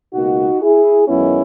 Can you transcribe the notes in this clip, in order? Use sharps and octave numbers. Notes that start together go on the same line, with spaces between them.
C#2 B2 A#3 D#4 F#4
E4 G#4
F#2 D#3 G#3 B3 C#4 E4